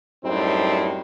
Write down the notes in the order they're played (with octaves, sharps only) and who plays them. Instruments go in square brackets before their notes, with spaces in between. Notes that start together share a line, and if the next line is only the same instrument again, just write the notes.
[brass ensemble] F#2 A2 G3 C4 D#4